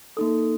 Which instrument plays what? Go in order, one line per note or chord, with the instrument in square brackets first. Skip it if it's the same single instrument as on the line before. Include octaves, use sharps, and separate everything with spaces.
[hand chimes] A#3 D#4 A4 D#6